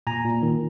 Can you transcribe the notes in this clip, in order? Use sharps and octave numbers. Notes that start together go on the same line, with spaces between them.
A#2 G#5 A#5
A#2
D#3